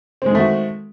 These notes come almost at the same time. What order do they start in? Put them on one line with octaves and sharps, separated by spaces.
C4 G#3 D#3 A3 F#4